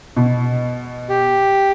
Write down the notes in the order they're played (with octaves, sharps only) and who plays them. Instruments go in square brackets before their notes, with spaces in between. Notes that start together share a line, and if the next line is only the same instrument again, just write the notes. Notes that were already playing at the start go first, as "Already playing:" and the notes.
[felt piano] B2
[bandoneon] G4